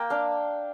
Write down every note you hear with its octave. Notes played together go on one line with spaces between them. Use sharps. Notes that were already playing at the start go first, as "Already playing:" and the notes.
Already playing: A#3 G5 A#5
D4 F5